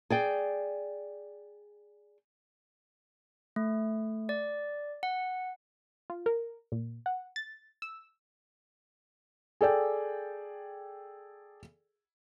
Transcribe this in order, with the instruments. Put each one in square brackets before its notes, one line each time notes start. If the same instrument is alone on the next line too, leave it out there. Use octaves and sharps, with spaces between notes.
[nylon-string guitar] G#4 D5 G5
[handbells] A3
D5
F#5
[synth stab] F4
A#4
A#2
F#5
A6
E6
[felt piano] G#4 A4 D5 G5